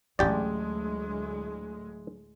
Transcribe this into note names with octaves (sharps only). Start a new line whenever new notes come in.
A1 D2 A2 F#3 G#3 A3 G4 D5